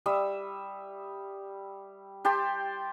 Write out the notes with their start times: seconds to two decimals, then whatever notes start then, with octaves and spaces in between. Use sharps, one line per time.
0.06 G3 E5 D#6 E6
2.25 G4 G5 A5 C6